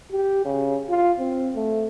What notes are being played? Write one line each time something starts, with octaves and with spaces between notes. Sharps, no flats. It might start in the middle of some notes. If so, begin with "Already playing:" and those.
G4
C#3
F4
C4
A3